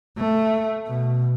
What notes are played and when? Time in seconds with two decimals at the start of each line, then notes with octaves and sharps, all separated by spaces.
0.18 A3
0.88 B2